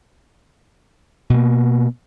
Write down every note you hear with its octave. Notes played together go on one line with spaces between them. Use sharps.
B2 A#3